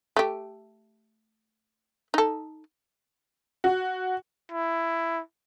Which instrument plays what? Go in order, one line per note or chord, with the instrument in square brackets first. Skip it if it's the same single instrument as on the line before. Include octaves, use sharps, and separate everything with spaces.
[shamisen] A3 G4
D#4 A4
[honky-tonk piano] F#4
[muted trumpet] E4